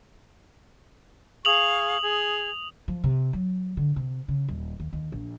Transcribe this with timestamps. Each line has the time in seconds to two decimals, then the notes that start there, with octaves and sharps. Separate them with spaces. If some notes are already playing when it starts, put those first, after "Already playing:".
1.45 G#4 F5 C#6 D#6 F7 F#7
2.01 G#4
2.88 F3
3.04 C3
3.33 F#3
3.77 D3
3.96 C3
4.28 C#3
4.49 D#1
4.80 D#2
4.93 D#2
5.12 A#1